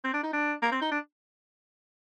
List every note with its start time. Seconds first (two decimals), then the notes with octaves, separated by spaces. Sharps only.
0.04 C4
0.14 D4
0.23 D#4
0.33 D4
0.62 A#3
0.72 C4
0.82 D#4
0.92 D4